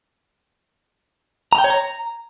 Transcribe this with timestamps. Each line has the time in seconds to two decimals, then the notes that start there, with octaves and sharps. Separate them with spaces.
1.53 A#5
1.58 G5
1.64 C#5
1.70 A#5